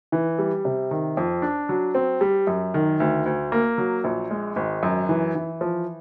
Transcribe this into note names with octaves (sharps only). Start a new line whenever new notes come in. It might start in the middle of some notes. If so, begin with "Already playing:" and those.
E3
G3
C3
D#3
F2
D4
F#3
C4
G3
F#2
D#3
D2
D2
A#3
F#3
A#1
G#3
G#1
F#2
E3
E3
F3